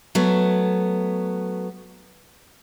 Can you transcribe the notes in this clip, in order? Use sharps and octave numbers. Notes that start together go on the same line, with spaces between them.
F#3 A3 B3